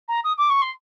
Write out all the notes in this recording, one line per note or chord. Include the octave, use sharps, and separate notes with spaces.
A#5
D#6
D6
C#6
C6